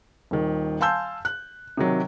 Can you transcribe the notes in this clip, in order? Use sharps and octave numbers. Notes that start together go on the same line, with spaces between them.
D#1 D#3
F5 G#5 A5 C6 E6 G6
F#6
C3 D#3 F#3